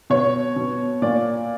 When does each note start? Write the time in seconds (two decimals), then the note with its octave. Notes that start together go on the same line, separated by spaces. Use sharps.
0.10 B2 C#5
0.56 B2
1.02 A#2 D5